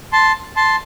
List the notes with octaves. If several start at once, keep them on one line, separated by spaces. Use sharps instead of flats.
A5 C6
A5 C6